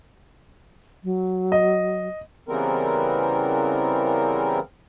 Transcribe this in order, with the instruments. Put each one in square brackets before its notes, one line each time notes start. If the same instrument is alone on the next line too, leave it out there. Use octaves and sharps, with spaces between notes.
[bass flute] F#3
[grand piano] D#5
[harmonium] C#3 E3 G3 B3 C4 A#4